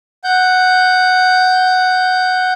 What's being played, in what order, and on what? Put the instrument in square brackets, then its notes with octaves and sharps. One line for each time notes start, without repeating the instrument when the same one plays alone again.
[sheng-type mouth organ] F#5 G6